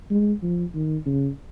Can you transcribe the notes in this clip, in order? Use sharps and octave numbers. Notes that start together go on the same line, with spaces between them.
G#3
F3
D#3
C#3